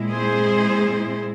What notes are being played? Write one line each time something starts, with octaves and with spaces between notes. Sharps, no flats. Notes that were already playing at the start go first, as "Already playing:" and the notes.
Already playing: A#2 G#3 C4 E4
G#4 C5